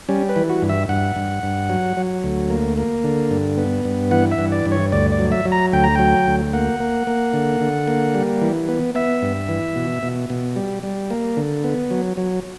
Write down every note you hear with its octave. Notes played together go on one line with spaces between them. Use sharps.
G3 C#4
B4
E3
F#4
G2
E5
G2 F#5
G2
G2
F#3
F#3
D2
A#3
A#3
D3
G2
B3
G2
E3 F#5
E5
G2
D5
G2
C#5
D2 D5
D5
F#3
E5
F#3
A#5
D2 G5
A#5
F#3 G5
D2
A#3 F#5
A#3
A#3
D3
D3
A#3
G3
E3
B3
B3 E5
G2
E3
B2
B2
B2
G3
G3
A#3
D3
B3
F#3
F#3